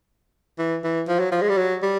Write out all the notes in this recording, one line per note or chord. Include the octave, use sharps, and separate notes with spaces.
E3
E3
F3
F#3
F3
G#3
G3
F#3
G3